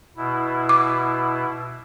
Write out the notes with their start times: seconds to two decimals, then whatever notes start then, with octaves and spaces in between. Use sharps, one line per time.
0.17 B2 E4
0.69 D6